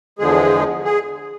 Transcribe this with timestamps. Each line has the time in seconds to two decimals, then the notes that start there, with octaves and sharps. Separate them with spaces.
0.19 E2 D3 F3 G#3 G#4
0.84 G#4